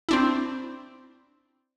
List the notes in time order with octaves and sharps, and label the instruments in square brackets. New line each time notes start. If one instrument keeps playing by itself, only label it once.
[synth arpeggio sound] C4 D4 E4